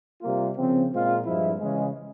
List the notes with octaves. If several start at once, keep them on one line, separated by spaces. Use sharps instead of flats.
C3 G3 A#3 F4
C#3 F3 C4
A#2 G#3 C4 F4
G2 F3 G#3 E4
C#3 E3 G#3